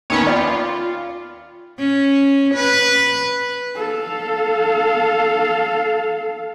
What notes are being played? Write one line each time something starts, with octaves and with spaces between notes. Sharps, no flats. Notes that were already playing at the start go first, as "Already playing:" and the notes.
D#2 D#3 B3 C#4 C#5
F4 D5 G5 B5
C#4
B4
A4 F5